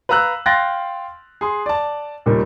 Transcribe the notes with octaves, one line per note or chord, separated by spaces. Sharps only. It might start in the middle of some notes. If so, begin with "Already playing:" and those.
B4 F5 A#5 E6 F#6
F5 G5 C6 F#6 A6 A#6
G#4 C6
D5 A5
D#2 A#2 D#3 G3